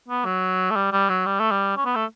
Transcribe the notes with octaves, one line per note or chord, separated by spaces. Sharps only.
B3
F#3
A3
G3
G3
F#3
G3
A3
G3
C#4
B3
A3